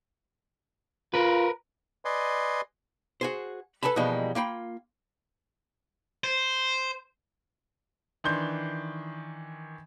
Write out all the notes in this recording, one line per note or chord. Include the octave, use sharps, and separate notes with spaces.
F4 A#4 B4
B4 D5 D#5 G#5 C6
F#4 G#4 C5
A4 B4 G#5 A5 B5
B2 E3 F3 G3 G#3 A#3
A#3 F4 G5 B5
C5
D#3 E3 D4 C6 G6